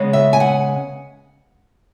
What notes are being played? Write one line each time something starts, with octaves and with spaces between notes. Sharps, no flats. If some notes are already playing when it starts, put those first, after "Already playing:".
Already playing: C#3 G#3 B3
E5
G#5
F#5